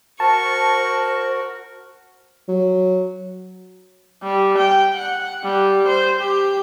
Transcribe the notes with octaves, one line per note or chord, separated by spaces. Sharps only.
F#4 A#4 C5 A5 C#6
F#3
G3
G5
F#5
G3
C5
G4